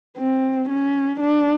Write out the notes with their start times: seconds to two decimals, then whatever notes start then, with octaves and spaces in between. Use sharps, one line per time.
0.18 C4
0.69 C#4
1.20 D4